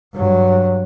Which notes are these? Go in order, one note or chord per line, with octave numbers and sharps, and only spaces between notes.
G2 F#3